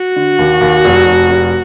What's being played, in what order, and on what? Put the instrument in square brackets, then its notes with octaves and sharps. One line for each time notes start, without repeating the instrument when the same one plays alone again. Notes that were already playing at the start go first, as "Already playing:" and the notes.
Already playing: [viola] F#4
[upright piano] D3
D#2
D#2
F1
F1
F1